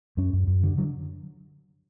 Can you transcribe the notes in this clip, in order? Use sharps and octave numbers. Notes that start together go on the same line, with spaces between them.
F#2 C#4
F#2
F#2
D3
D3 F#3